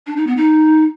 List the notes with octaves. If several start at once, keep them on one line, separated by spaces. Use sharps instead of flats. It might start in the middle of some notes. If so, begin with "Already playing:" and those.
D4
D#4
B3
D#4